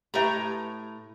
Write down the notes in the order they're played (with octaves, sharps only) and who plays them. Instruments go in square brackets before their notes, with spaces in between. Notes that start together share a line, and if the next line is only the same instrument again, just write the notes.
[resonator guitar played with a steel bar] A2 A#5 [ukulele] G4 B4 E5